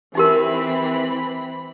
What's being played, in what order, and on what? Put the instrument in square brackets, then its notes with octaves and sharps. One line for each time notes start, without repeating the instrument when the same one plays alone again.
[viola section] E3 C4 B5 [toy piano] D#4 G4 A#4